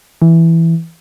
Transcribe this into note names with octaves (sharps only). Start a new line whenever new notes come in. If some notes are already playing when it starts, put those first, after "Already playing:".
E3